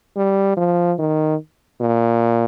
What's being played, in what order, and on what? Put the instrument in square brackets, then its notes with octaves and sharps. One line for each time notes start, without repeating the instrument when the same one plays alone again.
[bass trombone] G3
F3
D#3
A#2